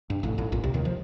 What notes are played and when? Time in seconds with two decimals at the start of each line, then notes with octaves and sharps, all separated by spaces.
0.10 G2
0.23 A1 A2
0.38 A1 A2
0.52 A#1 A#2
0.64 C2 C3
0.74 D#2 D#3
0.85 F3